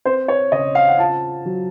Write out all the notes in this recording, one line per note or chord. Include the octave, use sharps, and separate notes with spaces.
C4 C5
C#5
C#3 D#5
F5
F#5
F4 A5
F#3